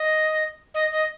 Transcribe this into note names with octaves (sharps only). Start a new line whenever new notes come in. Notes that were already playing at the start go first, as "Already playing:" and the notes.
Already playing: D#5
D#5
D#5